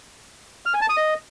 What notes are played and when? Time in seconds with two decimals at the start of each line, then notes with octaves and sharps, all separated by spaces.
0.66 F6
0.74 G#5
0.81 A5
0.89 D#6
0.97 D#5